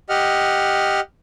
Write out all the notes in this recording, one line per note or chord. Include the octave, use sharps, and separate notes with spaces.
G4 D#5 F#5 F6